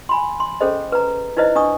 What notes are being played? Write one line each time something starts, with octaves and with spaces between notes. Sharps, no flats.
G#5 B5 C6
C6
C#4 G#4 A4 C5 D#5
B4 A#5
D#4 E4 B4 C5 D#5
D4 D#5 C#6 D#6